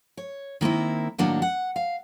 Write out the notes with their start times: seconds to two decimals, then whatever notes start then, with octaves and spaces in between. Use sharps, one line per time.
0.17 C#5
0.61 D#3 A#3 C4 E4
1.18 A2 D#3 F#3 A#3 D4 F#5
1.42 F#5
1.76 F5